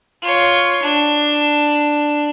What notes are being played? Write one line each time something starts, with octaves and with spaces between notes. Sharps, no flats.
F4 C#5
D4